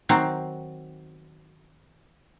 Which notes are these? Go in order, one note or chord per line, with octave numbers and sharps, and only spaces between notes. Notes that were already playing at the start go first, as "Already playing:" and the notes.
D#3 F#3 C4